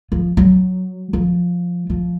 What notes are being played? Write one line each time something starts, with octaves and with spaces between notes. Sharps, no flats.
F3
F#3
F3
F3